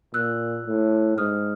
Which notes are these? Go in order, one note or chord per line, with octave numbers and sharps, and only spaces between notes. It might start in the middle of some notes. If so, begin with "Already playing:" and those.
A#2 E6 F#6
A2
G#2 D#6 F6